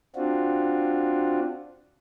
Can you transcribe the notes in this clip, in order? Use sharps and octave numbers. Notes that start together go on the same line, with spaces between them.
C4 D4 F4 F#4